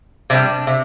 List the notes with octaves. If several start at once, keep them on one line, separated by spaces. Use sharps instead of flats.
C3 G3 D4
C3